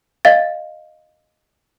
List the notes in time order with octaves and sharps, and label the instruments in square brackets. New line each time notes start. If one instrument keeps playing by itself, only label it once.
[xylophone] D#5 F5 A6